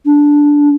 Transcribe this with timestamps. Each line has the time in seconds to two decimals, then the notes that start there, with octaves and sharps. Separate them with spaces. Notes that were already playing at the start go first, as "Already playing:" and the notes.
0.06 D4